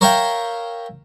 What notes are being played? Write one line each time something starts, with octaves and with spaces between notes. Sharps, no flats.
A#4 C#5 E5 F5 G5 A#5